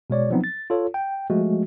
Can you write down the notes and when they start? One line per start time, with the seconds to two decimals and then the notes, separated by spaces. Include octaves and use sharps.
0.10 B2 G#3 C#5 D5
0.30 F3 F#3 B3 C4 D#4
0.44 A6
0.70 F4 A4 C#5
0.94 G5
1.30 F3 G#3 A3 F#4